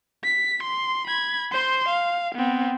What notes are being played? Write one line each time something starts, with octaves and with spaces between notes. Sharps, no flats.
B6
C6
B5 G#6
C5 C6
F5
B3 C4